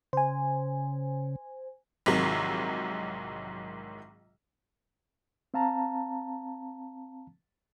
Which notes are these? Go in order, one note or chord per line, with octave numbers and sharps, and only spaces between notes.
C#3 C5 G#5
A#1 G#2 C3 D#3 F#3
C4 F5 A5 A#5